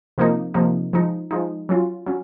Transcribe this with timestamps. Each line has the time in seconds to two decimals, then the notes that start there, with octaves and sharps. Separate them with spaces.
0.18 C3 F3 A#3 D#4
0.54 C3 F3 A#3 D#4
0.93 F3 G#3 D#4
1.31 F3 G#3 D#4
1.69 F#3 C#4 F4
2.06 F#3 C#4